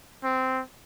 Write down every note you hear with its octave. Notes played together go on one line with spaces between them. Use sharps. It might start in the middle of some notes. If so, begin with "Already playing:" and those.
C4